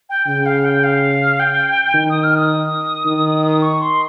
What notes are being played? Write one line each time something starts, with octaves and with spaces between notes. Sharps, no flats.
G5
C#3 G5
F5
G5
F5
G5
D#3
D#6
F6
D#6
D#3
C#6
C6